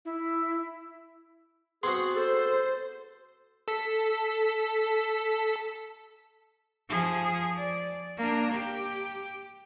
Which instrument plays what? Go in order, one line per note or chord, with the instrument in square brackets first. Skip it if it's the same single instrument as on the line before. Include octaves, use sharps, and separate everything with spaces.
[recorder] E4
[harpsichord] B3 C4 F#4 [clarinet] G#4 [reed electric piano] C6
[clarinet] A4 [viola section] C5
[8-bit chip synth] A4 B6
[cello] F3 G#4
D5
A#3 D4
G4